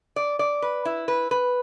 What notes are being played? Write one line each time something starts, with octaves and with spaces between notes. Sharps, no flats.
D5
D5
B4
E4
B4
B4